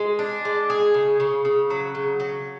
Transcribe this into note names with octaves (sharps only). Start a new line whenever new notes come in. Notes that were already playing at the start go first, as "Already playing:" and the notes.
Already playing: G#3
D4
G#3
G#4
C#3
C#3
C#3
F#3
C#3
F#3